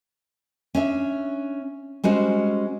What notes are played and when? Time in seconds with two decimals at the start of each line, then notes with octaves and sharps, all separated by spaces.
0.75 C#4 D4 E5
2.04 G3 G#3 C#4 F#4 C5